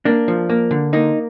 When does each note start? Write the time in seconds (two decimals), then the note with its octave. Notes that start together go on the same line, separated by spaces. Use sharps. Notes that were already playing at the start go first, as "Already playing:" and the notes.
0.05 A#3 D4
0.28 F3
0.50 A#3
0.71 D3
0.93 A#3 D#4